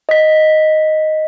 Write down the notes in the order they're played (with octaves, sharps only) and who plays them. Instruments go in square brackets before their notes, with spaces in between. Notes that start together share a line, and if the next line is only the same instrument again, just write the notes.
[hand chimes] D#5 B6